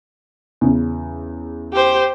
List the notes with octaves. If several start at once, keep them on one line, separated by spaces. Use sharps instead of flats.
E2 C#3
G4 C5